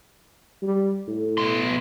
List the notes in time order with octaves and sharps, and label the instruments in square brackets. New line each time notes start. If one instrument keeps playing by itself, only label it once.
[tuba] G3
A2
[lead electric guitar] B2 C6